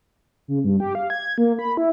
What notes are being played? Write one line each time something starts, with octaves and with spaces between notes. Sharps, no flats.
C#3
G2
G4
F5
G#6
A#3
B5
E4